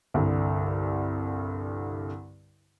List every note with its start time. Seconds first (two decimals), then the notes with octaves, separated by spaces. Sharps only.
0.14 C2 G2 D3